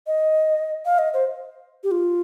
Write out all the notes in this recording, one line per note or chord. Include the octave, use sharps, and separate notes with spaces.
D#5
F5
D#5
C5
G4
F4